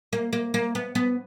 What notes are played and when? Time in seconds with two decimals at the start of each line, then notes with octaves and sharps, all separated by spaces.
0.13 A#3
0.33 A#3
0.54 A#3
0.75 B3
0.95 B3